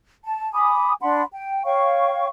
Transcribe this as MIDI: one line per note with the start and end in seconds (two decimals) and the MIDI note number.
0.24 0.52 81
0.53 0.93 80
0.53 0.93 83
0.53 0.93 86
0.53 0.93 87
1.01 1.22 62
1.01 1.22 78
1.01 1.22 83
1.01 1.22 84
1.31 1.63 79
1.65 2.27 73
1.65 2.27 77
1.65 2.27 79
1.65 2.27 85